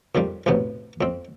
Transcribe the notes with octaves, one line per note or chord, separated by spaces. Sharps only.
F2 D#3 F3 G3
B1 F2 A2 C3 B3
F2 C4